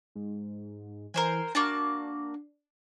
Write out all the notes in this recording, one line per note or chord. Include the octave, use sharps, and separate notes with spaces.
G#2
E3 A#4 C5 G#5
A#3 D4 F#4 A5